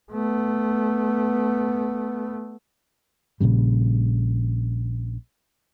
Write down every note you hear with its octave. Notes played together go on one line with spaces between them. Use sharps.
A3 B3
A#1 A#2 C#3 G3